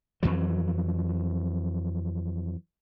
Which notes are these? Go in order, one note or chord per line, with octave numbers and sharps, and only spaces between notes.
F2 E3 F#3